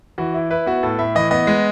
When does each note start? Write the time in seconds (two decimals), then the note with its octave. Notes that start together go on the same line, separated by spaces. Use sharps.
0.18 E3 F#4
0.34 E4
0.50 E4 B4
0.66 B3 F#4
0.83 A2 A4
0.99 A2 E5
1.15 E3 D#5
1.31 B3 D#5
1.47 G#3